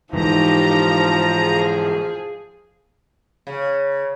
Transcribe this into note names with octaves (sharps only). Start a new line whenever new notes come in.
G#2 E3 F3 D#4 G4 A#5
G#4
C#3